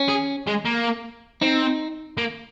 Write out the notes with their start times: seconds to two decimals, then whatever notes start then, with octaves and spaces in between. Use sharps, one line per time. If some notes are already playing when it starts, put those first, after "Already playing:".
Already playing: C#4
0.08 G#4
0.47 G#3
0.65 A#3
1.42 C4 D#4
2.17 A#3